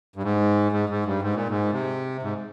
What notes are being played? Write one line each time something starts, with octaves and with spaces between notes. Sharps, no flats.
G2
G#2
G#2
G#2
G2
G#2
A#2
G#2
C3
G#2